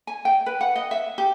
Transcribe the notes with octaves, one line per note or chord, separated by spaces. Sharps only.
G#5
G5
B4
F#5
D#5
E5
G4